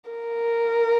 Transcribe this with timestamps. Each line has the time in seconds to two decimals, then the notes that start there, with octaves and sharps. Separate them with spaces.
0.11 A#4